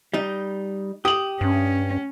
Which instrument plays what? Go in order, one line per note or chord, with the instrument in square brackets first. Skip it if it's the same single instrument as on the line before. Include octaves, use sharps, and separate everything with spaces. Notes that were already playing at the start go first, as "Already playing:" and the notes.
[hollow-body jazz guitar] G3 D#4
[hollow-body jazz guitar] G4 [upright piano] D#6 F#7
[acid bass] G2 [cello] C#4